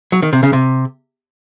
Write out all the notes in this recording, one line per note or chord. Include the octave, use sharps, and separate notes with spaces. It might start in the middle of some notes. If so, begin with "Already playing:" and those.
F#3
D#3
C3
C#3
C3